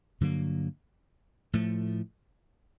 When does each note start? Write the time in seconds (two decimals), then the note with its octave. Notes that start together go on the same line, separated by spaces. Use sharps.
0.21 G2 D3 F#3 A#3
1.53 A2 F3 A3